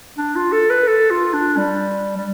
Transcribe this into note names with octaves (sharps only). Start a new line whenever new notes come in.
D4
F4
A4
B4
A4
F4
D4
G3
G3